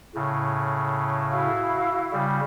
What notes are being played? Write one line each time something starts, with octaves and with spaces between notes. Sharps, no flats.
A2 C#3
E4 F#4 F5
C#3 G3